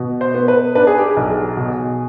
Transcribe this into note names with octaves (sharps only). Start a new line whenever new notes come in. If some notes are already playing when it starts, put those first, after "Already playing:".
Already playing: B2
C5
B3
B4
D4 B4
G#4
G4
G#4
B1
B2